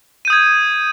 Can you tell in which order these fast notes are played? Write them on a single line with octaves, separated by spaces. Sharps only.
D#7 G6 D#6 G#6